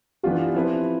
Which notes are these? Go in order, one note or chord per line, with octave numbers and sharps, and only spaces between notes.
E3 B3 D4 F4 G4
F3 C4 E4 B4